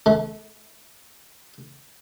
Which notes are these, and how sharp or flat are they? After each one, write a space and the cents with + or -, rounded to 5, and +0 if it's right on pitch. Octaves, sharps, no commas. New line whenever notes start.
A3 -35